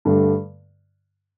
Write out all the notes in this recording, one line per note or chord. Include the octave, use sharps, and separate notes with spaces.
G2 D3 A3